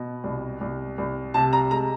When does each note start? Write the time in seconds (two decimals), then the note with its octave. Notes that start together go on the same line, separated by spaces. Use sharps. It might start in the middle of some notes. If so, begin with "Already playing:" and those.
Already playing: B2
0.24 C2
0.61 C2
0.98 C2
1.34 C3 A5
1.53 A#5
1.71 G#3 A#5